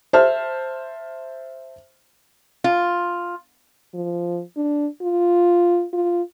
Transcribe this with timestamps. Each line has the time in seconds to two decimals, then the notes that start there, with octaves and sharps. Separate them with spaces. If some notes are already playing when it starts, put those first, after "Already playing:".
0.13 C5 E5 A5 F6
2.64 F4
3.94 F3
4.57 D4
5.02 F4
5.93 F4